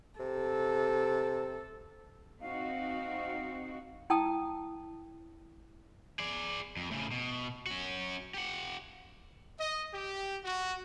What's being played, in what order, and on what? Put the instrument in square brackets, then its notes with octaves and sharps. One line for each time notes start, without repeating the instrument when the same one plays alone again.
[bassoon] C3 [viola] A4
[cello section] C4 D#4 F#4 [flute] F5
[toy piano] E4 G5 A5 D#6
[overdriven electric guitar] G#4 D5
F2
A2 C#3
B2
C#4 F#4
G4 F#5
[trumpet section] D#5
G4
F#4